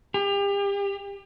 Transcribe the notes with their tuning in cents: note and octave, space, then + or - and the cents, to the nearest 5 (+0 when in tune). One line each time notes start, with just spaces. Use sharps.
G4 +35